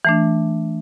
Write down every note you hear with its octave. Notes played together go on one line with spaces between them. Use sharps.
E3 A3 D4